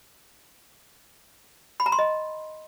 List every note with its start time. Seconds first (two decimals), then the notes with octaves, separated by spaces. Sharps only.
1.80 B5
1.86 A#5
1.92 C6
1.99 D#5